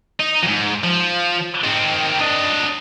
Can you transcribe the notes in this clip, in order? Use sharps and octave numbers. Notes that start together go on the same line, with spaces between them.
D#4
F2 G#2
F3
D#3 C4
D4 D#5